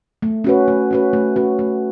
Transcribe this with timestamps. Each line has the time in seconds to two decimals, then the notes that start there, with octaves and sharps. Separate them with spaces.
0.22 A3
0.44 C#4 F#4 B4
0.68 A3
0.91 C#4 F#4 B4
1.13 A3
1.36 C#4 F#4 B4
1.59 A3